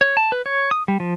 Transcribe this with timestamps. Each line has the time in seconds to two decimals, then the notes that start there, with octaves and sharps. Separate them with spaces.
0.01 C#5
0.17 A5
0.32 B4
0.46 C#5
0.71 D#6
0.88 G3
1.00 F3